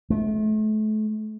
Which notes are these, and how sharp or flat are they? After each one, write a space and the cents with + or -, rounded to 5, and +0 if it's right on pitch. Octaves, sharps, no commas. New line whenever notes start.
A3 -35